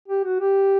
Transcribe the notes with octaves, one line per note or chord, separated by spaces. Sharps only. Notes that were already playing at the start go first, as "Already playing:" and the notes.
G4
F#4
G4